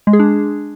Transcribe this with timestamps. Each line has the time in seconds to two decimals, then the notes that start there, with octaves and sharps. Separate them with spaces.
0.07 G#3
0.13 G#4
0.19 D4